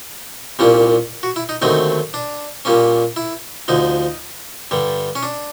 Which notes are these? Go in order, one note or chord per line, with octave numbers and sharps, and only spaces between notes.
C2 A#2 G3 A#3 C#4
F#4
E4
D#4
D#2 D3 F#3 A3 C4 D#4
D4
A#2 G3 A#3 C#4
E4
D2 D3 F3 D#4
G2 D3 G3
C#4
D4